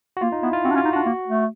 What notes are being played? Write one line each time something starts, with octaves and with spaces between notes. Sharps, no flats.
F#4
A#3 F4
D#4
B3 E4
F4
C4 F#4
D4
C#4
F4
D#4
D4 F#4
A#3
A3